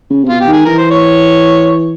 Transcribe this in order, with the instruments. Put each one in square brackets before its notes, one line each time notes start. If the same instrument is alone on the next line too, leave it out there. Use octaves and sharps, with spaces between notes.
[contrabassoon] C#3
C3
[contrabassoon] B2 [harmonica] F4
[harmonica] G4
[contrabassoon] D#3
[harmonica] G#4
[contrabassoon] E3 [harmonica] A#4
[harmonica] C5
C#5